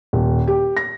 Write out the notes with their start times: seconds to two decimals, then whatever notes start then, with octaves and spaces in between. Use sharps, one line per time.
0.13 D#1
0.48 G4
0.77 A#6